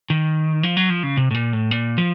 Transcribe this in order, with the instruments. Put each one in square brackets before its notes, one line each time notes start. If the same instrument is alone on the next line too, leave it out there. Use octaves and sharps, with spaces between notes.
[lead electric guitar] D#3
F3
F#3
F3
C#3
C3
A2
A#2
A2
A#2
F3